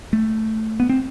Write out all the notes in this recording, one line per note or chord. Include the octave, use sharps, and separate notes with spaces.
A3
B3
C4